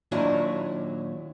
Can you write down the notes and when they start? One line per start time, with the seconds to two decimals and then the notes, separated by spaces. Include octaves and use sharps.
0.12 D#2 A#2 F#3 D4 E4 G#5